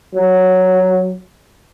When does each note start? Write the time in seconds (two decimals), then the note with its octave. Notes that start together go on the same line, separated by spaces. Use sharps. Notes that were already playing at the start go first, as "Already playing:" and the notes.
0.15 F#3